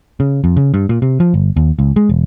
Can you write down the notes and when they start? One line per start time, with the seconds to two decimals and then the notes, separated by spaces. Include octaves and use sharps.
0.20 C#3
0.44 F2
0.57 C#3
0.74 G2
0.89 A#2
1.02 C3
1.20 F3
1.34 G1
1.56 D#2
1.79 C#2
1.96 G#3
2.09 E1